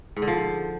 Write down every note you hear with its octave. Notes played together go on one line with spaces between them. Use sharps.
G#2
D3
F3